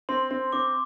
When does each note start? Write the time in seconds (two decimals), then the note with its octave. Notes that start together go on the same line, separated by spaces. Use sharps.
0.09 C4 C6
0.31 C4
0.52 C4 D6